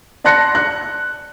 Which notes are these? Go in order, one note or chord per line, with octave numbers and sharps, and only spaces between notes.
D5 A5 C6 F#6 A#6 C#7
F#6